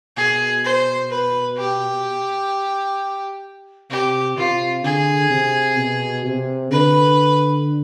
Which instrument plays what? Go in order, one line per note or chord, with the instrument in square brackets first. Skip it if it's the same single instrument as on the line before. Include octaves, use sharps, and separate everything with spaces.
[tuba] B2 [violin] G#4
[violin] C5
B4
G4
[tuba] C3 [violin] G4
[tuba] C3 [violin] F4
[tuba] D3 [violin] G#4
[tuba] C3
B2
C3
[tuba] D3 [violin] B4